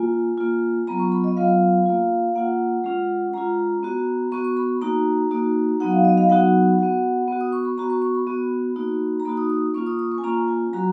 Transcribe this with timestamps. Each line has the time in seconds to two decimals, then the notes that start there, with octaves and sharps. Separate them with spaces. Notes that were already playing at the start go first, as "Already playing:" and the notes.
Already playing: A#3 F4 G#5
0.38 A#3 F4
0.87 F#3 B3 F4 A#5
0.99 C#6
1.12 B5
1.24 D#5
1.37 F#3 B3 F4 F5
1.86 A#3 F4
2.35 A#3 F4 F#5
2.84 G#3 C#4 F4
3.34 G#3 C#4 F4 A#5
3.83 B3 F#4
4.32 B3 F#4 C#6
4.44 C#6
4.57 B5
4.82 A#3 D#4 F#4 A#5
5.31 A#3 D#4 F#4
5.80 F#3 B3 D#4 F#4 F#5
5.92 F5
6.05 D#5
6.18 F5
6.29 F#3 B3 D#4 F#4 F#5
6.78 B3 F#4
7.28 B3 F#4
7.41 D#6
7.52 C#6
7.65 B5
7.77 B3 F#4 A#5
7.90 C#6
8.02 C#6
8.15 B5
8.27 B3 F#4
8.76 A#3 D#4 F#4
9.20 A#5
9.25 A#3 D#4 F#4 B5
9.37 D#6
9.50 D#6
9.74 A#3 C#4 F4 C#6
9.87 D#6
9.99 D#6
10.12 C#6
10.18 G#5
10.24 A#3 C#4 F4 A#5
10.48 G#5
10.73 F#3 C#4 F#4 A#5